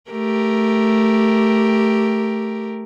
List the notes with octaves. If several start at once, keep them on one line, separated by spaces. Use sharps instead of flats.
A3 G4 A#4